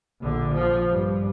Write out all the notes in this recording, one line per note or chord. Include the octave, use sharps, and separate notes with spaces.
A#1 D3
F3
G2